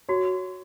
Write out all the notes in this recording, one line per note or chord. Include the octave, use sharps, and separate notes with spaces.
F#4 C#5